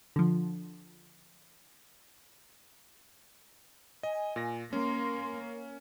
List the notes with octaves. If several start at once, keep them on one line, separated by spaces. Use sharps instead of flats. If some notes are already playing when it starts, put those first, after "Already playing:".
D3 F3
D#5 G#5
A#2 A#6
A#3 C#4 C6